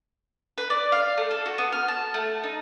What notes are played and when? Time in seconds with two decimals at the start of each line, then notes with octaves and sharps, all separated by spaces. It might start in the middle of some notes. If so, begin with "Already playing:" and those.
0.58 B4
0.70 D5
0.92 F5
1.17 A3
1.31 A4
1.46 F#4
1.58 B3
1.72 F6
1.88 A5
2.14 A3
2.44 D#4